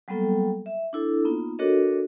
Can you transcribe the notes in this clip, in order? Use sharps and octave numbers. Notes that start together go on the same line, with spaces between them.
F#3 G3 A#3 B3 A4 G5
E5
D4 E4 A4
A#3 B3 D#4 F4
D4 F#4 A4 A#4 C#5 D#5